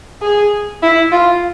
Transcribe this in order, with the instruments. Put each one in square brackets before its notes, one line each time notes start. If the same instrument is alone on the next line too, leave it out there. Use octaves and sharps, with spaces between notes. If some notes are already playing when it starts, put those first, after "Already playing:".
[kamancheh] G#4
E4
F4